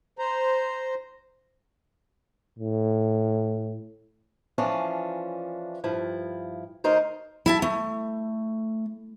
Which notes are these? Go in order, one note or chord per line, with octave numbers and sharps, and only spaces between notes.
C5 A#5
A2
E3 F3 C#4 D4
G2 F3 E4
D2 D#4 A#4 C5
E4 E5 A5
A3